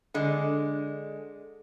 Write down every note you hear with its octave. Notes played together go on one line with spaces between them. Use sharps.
D3 G#3